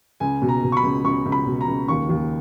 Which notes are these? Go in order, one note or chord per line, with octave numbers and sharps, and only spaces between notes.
C#2 G#5
B2
A#5
B2
C#6
B5
C#2
C#2 C#6
C#2
B5
B2
A#5
C#2
D#2 C#6
D#2